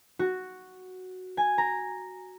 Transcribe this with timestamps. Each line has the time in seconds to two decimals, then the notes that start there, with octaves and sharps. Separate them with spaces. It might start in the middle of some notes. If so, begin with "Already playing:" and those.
0.19 F#4
1.37 G#5
1.58 A#5